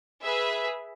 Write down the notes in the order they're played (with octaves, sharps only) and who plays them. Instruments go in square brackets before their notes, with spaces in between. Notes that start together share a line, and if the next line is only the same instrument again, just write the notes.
[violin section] G#4 B4 E5